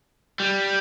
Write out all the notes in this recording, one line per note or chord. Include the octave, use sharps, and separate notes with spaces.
G3